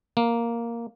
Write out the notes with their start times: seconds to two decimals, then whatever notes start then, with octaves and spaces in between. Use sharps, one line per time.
0.17 A#3